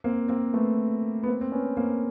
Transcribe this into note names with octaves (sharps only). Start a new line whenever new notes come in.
A#3 C4
A#3 C4
A3 B3
B3
A#3 C4
C4
B3 C#4
A#3 C4